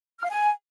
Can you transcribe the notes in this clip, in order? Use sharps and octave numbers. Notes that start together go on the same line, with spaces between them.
F6
F5
G#5